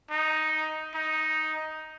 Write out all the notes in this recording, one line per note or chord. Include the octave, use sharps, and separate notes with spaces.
D#4
D#4